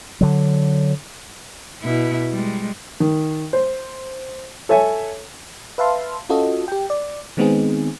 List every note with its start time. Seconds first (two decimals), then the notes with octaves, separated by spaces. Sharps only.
0.21 D3 F#3
1.82 B2 E4
2.31 G3 G#3
3.00 D#3
3.53 C5
4.69 A4 C#5 E5 G#5
5.78 B4 E5 F5 A5 C6
6.29 C#4 F4 F#4 A4 D#5
6.68 G4 G5
6.90 D5
7.37 D#3 G#3 B3 C4 D#4 G#4